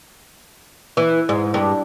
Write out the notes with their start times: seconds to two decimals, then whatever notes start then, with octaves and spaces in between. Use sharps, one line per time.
0.97 E3
1.29 G#2
1.54 G2